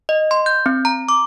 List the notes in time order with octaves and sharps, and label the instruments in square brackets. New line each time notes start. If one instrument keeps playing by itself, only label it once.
[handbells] D#5
C6
G6
C4
A#5
D6